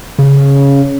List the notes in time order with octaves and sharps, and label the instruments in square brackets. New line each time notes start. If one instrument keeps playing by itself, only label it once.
[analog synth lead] C#3